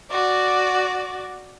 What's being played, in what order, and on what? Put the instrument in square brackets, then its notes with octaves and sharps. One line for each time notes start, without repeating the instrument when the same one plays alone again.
[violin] F#4 D5